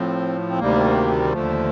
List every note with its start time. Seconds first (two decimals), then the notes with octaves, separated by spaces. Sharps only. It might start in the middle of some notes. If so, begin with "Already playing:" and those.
Already playing: A2 F3 C4
0.49 C4
0.59 D2 C3 D#3 G3 A#3
1.32 D#2 D3 F3 A3